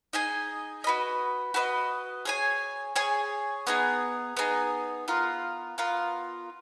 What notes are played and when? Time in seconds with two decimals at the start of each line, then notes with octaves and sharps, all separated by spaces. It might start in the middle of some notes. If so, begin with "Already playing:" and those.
0.13 D#4 G#4 D#5 G#5
0.84 F#4 B4 D#5
1.54 F#4 B4 D#5
2.25 G#4 C#5 G#5
2.96 G#4 C#5 G#5
3.67 B3 D#4 G#4
4.37 B3 D#4 G#4
5.08 B3 F4 A#4
5.78 B3 F4 A#4